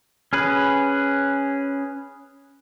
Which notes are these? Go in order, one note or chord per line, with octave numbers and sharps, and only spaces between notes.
C#4 G#4 B4